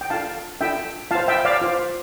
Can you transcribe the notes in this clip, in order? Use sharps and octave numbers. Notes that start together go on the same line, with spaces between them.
G5
D4 F4 A4 F5 A5
D4 F4 A4 E5 G5
F4 C5 F5 A5
E5 G5
D5 F5
F4 C5